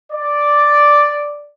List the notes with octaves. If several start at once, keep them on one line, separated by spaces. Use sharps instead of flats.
D5